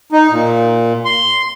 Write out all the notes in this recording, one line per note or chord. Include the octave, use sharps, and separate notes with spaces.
D#4
A#2
C6